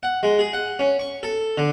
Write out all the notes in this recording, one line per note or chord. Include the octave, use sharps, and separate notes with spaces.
F#5
G#3
G#4
F#5
C#4
C#6
A4
D3